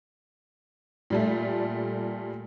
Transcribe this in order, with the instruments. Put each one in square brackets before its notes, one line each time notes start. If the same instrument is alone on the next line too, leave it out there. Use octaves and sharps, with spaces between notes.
[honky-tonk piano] A#2 G3 A3